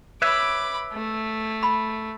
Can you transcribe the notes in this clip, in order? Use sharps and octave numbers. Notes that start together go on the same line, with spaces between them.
B4 C#5 E5 B5 D6
A3
B5